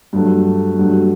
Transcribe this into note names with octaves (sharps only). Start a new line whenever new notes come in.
G2 F#3 A3
G2 F#3 A3